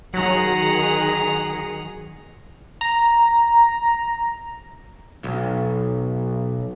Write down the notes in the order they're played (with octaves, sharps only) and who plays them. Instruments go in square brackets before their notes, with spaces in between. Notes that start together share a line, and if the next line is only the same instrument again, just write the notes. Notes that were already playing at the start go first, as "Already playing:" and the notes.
[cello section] D#3 G#4 [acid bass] F#3 [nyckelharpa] F#5 A#5
[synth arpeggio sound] A#5
[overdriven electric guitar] B1